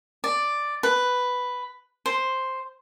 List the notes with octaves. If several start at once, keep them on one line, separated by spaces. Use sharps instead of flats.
D5
B4
C5